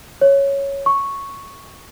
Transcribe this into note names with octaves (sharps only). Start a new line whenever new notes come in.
C#5
C#6